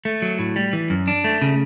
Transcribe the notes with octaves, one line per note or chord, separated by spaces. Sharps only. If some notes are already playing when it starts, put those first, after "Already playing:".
A3
F#3
A2
G3
E3
F#2
D4
A3
C#3